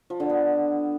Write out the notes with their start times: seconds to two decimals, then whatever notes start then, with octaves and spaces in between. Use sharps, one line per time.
0.10 F3
0.20 D3
0.30 B3